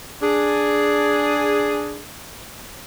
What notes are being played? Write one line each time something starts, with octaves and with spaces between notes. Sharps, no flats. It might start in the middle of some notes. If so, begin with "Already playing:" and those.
D4 G#4